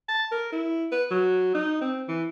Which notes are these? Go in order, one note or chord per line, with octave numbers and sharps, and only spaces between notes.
A5
A#4
E4
B4
F#3
D#4
C4
E3